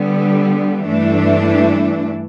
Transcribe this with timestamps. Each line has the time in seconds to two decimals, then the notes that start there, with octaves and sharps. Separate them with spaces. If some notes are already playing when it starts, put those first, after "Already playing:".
Already playing: D3 G3 B3
0.84 G2 E3 A3 D4